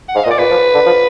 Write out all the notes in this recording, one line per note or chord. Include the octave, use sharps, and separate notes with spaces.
F#5
G#2 F5
A#2 D#5
D5
A#2 B4
F3
D3
F3